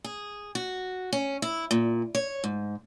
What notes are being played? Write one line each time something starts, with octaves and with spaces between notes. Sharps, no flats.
G#4
F#4
C#4
E4
A#2
C#5
G#2